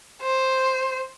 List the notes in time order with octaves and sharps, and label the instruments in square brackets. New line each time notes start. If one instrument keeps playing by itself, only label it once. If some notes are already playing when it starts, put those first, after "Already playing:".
[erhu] C5